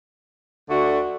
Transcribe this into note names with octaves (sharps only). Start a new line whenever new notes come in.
D2 D3 A3 D4 F#4